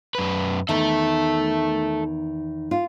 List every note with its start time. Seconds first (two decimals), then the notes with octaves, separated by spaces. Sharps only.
0.15 F#2 B4
0.69 E2 D#3 A4 E5
2.71 F4